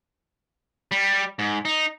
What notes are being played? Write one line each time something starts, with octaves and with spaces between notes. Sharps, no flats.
G3
G#2
D#4